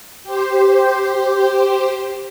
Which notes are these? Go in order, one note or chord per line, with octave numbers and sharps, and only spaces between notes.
G4 C5